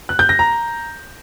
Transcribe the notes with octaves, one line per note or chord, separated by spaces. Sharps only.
F#6
G6
A#6
A#5